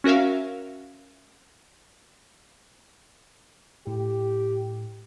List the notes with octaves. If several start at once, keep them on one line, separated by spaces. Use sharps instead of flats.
C#4 F#4 A#4 E5 F5
A2 G4